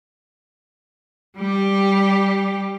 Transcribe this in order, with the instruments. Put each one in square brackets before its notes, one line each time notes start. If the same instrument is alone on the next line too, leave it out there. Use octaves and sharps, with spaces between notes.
[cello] G3 G4